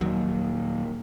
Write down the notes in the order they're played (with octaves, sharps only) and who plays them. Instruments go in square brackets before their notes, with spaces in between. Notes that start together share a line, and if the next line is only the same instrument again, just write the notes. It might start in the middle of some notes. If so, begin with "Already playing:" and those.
[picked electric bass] D#2 A#2 [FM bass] F#3